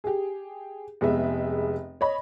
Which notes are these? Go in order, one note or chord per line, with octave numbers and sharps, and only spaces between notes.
G4 G#4
F1 G#3 B3 E5
C#5 D#5 B5